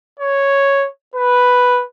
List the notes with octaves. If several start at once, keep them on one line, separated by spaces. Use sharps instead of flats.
C#5
B4